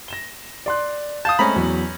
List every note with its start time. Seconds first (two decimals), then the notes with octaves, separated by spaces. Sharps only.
0.08 A#6 E7 G7
0.66 D5 C6 F#6
1.25 F5 A5 D#6 G6
1.39 G#3 A3 C4 C#4 A#5 B5
1.56 E2 F#3